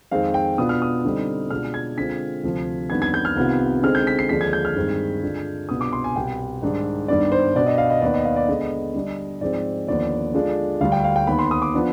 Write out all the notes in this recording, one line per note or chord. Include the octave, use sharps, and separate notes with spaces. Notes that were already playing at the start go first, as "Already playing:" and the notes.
F2 D#3 G#3 C4 F5
G5
B2 B3 D4 F4 D#6
F6
D#6
D3 G3 C4 D#4
B2 G#3 D4 F4 F6
G#6
D3 G#3 C4 F4 B6
D2 C3 F3
F2 D#3 G3 B3 D4 G#6
G#6
G6
F6
C2 C3 D#3 B3 F4
D3 G#3 C4 D#4 F6
G6
B6
C7
D#2 D3 F3 G#3 D4 B6
G#6
G6
F6
G2 D#3 G#3 C4
D3 G#3 D4 F4
C2 B2 B3 D4 F4 D#6
D6
C6
G#5
C2 B2 B3 G5
G#2 D#3 G3 D4
G2 D#3 G3 B3 D4 D5
C5
B2 B3 D4 D5
D#5
F5
D#5
D#2 D#3 B3 D5
D#5
F5
D5
D3 G#3 B3 D#5
D3 G3 D4
G#2 F3 G#3 C4 D5
D#2 D3 F3 B3 D5
D3 G#3 D4 F4
D2 D3 G3 F5
G5
F5
G5
D#2 D#3 B3 B5
C6
D#6
D6
F3 B3 D4 F4